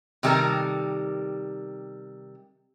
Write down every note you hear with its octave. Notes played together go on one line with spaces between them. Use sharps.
C3 D#3 G3 A4 A#4